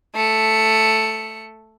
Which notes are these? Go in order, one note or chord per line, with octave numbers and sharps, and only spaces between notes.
A3 C#7